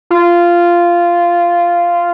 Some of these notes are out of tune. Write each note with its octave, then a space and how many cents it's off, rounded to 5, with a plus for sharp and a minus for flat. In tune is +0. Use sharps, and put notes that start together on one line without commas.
F4 -10